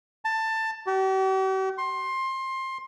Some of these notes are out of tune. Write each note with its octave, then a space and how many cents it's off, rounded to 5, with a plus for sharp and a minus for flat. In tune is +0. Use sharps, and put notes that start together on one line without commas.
A5 +15
G4 -45
C6 +20